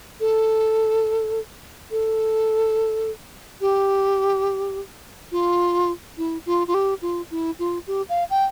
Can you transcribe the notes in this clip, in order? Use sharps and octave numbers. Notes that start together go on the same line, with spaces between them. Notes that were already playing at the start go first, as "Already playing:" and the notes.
A4
A4
G4
F4
E4
F4
F4
G4
F4
E4
F4
G4
F5
G5